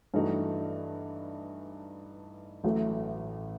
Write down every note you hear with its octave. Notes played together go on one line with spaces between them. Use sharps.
G2 E3 A3 D#4 F#4
A1 A2 F#3 A3